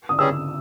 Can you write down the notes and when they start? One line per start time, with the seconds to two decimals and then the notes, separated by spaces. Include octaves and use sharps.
0.09 D#6
0.19 G2 G3 C#4 G#4 E6